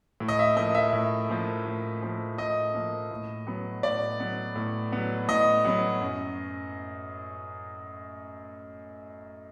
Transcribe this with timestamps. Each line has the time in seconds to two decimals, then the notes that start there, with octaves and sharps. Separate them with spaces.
0.20 A2
0.28 D#5
0.39 E5
0.57 F3 A#3 D#5
0.75 E5
0.93 A2
1.29 F3 A#3
1.66 A2
2.02 F3 A#3
2.38 A2 D#5
2.74 F3 A#3
3.11 A2
3.47 F#3 B3
3.83 A2 D5
4.20 F#3 B3
4.56 A2
4.92 F#3 B3
5.29 A2 D#5
5.65 F#3 B3
6.01 F#2